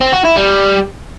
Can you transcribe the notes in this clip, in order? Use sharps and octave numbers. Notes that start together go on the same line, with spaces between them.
C4
F#4
E4
G3